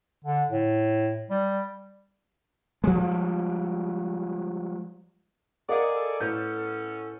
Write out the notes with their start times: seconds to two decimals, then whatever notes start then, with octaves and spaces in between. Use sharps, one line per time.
0.25 D3
0.50 A2
1.30 G3
2.84 F3 G3 G#3
5.69 G#4 A#4 D5 D#5 F5 F#5
5.93 A4
6.20 A2 B3 C#4 G6